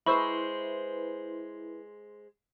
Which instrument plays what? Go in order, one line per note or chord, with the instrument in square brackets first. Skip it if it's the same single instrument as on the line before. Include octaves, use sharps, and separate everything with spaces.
[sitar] G#3 C5 [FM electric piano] E4 B4 [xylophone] B5 C#6 E6